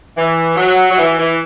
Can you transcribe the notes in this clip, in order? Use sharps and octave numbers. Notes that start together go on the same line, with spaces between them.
E3
F#3
F#3
E3
E3